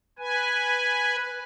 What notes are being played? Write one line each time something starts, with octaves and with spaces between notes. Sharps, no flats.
B4 G#5